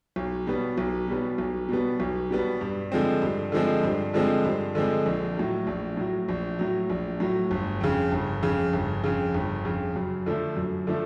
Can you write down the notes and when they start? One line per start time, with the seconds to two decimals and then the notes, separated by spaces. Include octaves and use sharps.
0.16 B1
0.47 B2 G3 B3
0.78 B1
1.08 B2 G3 B3
1.38 B1
1.69 B2 G3 B3
2.00 B1
2.31 B2 G3 B3
2.61 G2
2.92 D3 F3 G#3 C4
3.22 G2
3.52 D3 F3 G#3 C4
3.83 G2
4.14 D3 F3 G#3 C4
4.44 G2
4.75 D3 F3 G#3 C4
5.06 A#1
5.37 A2 F#3
5.67 A#1
5.97 A2 F#3
6.29 A#1
6.59 A2 F#3
6.90 A#1
7.20 A2 F#3
7.51 G1
7.81 F2 C#3
8.12 G1
8.43 F2 C#3
8.73 G1
9.04 F2 C#3
9.34 G1
9.65 F2 C#3
9.96 F#2
10.26 D3 F3 A3
10.57 F#2
10.87 D3 F3 A3